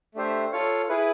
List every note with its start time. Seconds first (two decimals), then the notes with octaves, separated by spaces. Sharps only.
0.15 A3 D4 G4 C5 E5
0.52 F4 A4 C#5 F5
0.89 E4 G#4 B4